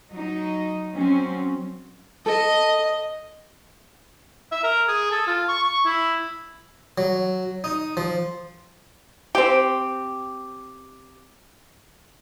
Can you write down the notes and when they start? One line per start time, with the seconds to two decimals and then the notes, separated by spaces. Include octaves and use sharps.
0.12 F#3 D#4
0.94 F#3 C4 C#4
2.26 A4 D#5
4.52 E5
4.64 A#4
4.88 G#4
5.11 A4
5.27 F4
5.48 C#6
5.63 C#6
5.85 E4
6.98 F#3
7.64 D#4
7.97 F3
9.35 C4 G4